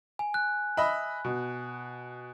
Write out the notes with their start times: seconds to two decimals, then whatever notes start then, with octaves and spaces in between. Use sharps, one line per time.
0.19 G#5
0.34 F#6
0.77 D#5 E5 B5
1.25 B2